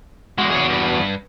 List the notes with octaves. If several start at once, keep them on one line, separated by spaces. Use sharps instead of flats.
E2 G#3 F#4
G#4 C#5
G2 B4